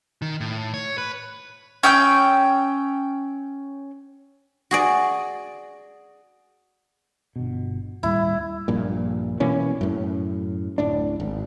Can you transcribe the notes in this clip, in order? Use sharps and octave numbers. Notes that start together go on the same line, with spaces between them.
D#3
A2
C#5
B4
C#4 G5 E6 G6
F#4 G#4 D5
G1 B2
D#2 A2 G3 E4
A#1 G2 A#2
B2 E3 A#3 C#4
F#2 A2
D1 A2 D4
G#1